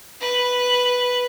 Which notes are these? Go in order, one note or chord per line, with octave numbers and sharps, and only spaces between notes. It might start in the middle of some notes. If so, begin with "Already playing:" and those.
B4